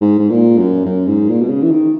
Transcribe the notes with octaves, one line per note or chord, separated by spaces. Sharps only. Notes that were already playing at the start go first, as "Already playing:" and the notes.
G#2
G#2
A#2
F#2
F#2
G#2
A#2
B2
C#3
E3
D#3